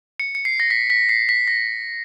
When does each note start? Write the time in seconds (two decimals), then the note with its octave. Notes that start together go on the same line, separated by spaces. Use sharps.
0.20 C#7
0.35 C#7
0.45 C7
0.60 A#6
0.70 B6
0.90 B6
1.09 C7
1.29 B6
1.48 A#6